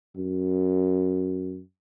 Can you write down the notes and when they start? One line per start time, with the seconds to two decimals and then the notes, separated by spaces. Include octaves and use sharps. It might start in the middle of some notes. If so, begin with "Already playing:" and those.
0.17 F#2